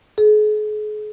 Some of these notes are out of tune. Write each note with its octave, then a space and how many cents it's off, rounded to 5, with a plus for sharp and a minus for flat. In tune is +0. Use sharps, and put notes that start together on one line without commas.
G#4 +40